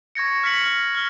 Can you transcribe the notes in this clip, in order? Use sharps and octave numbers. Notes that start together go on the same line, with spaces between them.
C#6 G#6 A#6 C#7
F6 B6 C#7 F#7
F6
F6 G7